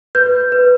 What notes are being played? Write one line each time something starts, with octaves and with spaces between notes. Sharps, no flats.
B4 G6
B4